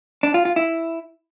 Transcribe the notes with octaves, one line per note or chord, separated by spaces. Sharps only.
D4
F4
F4
E4